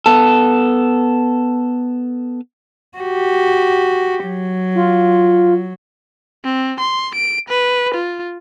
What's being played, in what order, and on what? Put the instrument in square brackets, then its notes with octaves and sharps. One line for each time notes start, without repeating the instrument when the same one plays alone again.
[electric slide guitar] B3 A4
[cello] F#4 G4
F#3
[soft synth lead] F4
[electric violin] C4
C6
D7
B4
F4